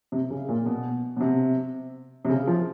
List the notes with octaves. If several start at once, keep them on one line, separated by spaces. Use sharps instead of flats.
C3
C#3
A#2
B2
B2
C3
C3
C#3
F3